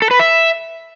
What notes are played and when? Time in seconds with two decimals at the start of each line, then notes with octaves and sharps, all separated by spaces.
0.02 A4
0.11 B4
0.19 E5